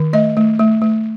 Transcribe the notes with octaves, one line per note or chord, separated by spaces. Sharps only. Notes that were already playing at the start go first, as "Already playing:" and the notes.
Already playing: D#3
A3 D#5
A3
A3
A3